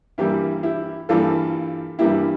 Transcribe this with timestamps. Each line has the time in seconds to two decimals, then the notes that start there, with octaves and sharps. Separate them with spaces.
0.18 G2 E3 G3 A#3 E4 G4
0.63 E4 G4
1.09 G2 E3 G3 A#3 F4 A4
1.99 G2 E3 G3 A#3 E4 G4